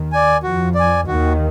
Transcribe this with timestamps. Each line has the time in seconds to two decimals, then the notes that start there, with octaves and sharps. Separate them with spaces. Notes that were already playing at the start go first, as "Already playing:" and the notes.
Already playing: D#2 D#3
0.12 D5 G#5
0.43 F2 F3 F#4
0.75 D5 G#5
1.07 D#2 D#3 F#4